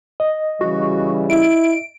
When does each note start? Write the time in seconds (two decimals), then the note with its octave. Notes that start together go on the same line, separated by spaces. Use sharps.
0.20 D#5
0.61 C#3 E3 G3 F#4
1.30 E4 D7